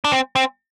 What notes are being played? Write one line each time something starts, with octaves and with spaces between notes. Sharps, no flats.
D4
C4
C4